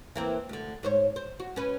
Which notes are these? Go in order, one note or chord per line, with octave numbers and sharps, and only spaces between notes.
E3 A#3 C4
D2 D3
G#2 C5 C#5
C5
F#4
C#4 B4